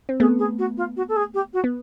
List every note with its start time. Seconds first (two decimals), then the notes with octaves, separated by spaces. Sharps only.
0.09 C4
0.20 A3 B3 G#4
0.39 G#4
0.58 F#4
0.77 F4
0.96 F#4
1.09 A4
1.16 G#4
1.34 G4
1.53 F#4
1.64 B3